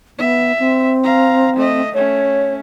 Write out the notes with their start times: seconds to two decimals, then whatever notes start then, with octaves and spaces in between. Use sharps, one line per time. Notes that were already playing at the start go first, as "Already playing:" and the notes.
0.19 B3 E5
0.59 C4
1.04 F5 A#5
1.56 A3 D#5
1.94 A3 C#4 C#5